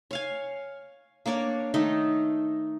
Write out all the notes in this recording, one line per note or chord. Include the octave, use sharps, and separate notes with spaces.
C#5 F5 G#5
A#3 D4 C#5 D5
D#3 A3 D#4